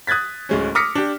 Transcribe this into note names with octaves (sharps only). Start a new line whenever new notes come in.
D#6 F#6 G#6 A6 B6
D1 G#3 C#4
D6 D#6 F6 A#6 B6 C#7
D4 G4